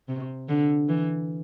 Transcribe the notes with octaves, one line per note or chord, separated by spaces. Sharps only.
C3
D3
E3